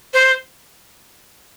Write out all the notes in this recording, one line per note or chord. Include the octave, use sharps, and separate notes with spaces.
C5